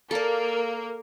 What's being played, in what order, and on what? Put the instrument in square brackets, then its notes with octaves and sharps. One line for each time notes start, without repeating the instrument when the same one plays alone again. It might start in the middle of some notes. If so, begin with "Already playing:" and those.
[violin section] A#3 A#4 [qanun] A4 D5